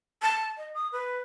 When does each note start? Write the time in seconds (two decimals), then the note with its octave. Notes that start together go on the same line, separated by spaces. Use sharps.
0.22 A5
0.57 D#5
0.74 D#6
0.92 B4